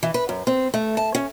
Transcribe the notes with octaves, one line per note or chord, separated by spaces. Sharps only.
E3
B4
F#2
C4
A3
A5
C#4